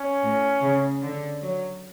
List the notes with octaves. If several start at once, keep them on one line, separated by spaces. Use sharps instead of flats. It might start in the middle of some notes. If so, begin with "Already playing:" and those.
Already playing: C#4
A2
C#3
D3
F#3